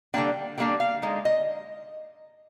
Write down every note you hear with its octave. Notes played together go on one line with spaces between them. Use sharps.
D3 G3 A#3 D4 G5
D3 G3 A#3 D4 G5
F5
D3 G#3 D#4
D#5